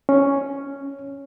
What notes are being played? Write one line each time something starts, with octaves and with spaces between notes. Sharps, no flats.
C#4